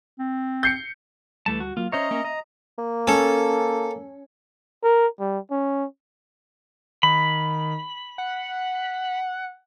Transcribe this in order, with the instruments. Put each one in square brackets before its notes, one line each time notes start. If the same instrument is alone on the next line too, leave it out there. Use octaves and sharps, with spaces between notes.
[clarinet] C4
[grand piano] G6 C7 C#7
[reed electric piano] D2 G3 [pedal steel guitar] E3 A3 A5
[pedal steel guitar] F#4
[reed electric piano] F#3 A#3 [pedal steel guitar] F4
[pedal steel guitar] C#4 C5 C#5 [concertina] D#5 A#5 [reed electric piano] E5
[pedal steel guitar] A#3 C#4
[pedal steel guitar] D#5 [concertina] A#5
[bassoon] A#3
[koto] C#4 [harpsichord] A4
[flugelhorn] A#4
G3
C#4
[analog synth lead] D#3 [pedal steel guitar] B5
[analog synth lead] F#5